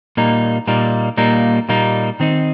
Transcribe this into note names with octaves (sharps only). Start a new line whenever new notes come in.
A#2 G3 A#3 D#4
A#2 G3 A#3 D#4
A#2 G3 A#3 D#4
A#2 G3 A#3 D#4
D#3 C4 D#4